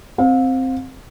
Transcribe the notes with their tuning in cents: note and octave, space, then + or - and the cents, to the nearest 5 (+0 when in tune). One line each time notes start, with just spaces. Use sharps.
C4 +0 F5 +35